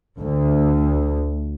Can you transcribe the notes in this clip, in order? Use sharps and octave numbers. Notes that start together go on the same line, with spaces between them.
D2